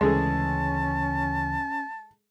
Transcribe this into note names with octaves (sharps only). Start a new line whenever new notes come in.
D2 C#3 E3 G#3 C#4 G#4 A4 A5